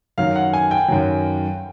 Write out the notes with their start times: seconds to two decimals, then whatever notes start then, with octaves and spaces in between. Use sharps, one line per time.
0.18 F#2 D#3 F#3 F5
0.36 F#5
0.53 G#5
0.71 G5
0.88 F#2 D#3 F#3